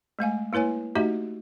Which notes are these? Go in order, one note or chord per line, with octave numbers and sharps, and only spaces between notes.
G#3 A3 F5 G#5
A#3 E4 B4 C#5 G#5
A3 D#4 F#4 G4 D#5 E5